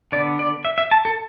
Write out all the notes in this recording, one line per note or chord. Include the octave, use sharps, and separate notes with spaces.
D3 B3 D5
D5
E5
E5
A5
A4